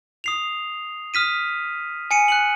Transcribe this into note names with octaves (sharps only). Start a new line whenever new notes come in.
D#6 C7 F7
D#6 F6 B6 D#7
G#5 C#7 D#7
F#6 C#7 F#7